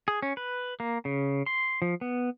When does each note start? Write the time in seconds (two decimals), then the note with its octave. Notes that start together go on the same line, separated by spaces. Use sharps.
0.08 G#4
0.22 C#4
0.37 B4
0.80 A#3
1.05 C#3
1.46 C6
1.82 F3
2.01 B3